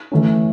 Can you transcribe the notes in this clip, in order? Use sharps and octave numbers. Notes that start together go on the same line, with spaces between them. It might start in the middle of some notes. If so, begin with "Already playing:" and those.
E3 A3 C#4